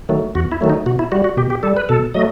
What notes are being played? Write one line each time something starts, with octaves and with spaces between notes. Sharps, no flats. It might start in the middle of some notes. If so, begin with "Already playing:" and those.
D#3 F#3 A3
E2 F#4
E4
D#3 F#3 A3
D#4
B2 F#4
E4
G3 F#4
F#4
B2 G4
G4
G3 A4
B4
B2 A4
F#3 A3 D#5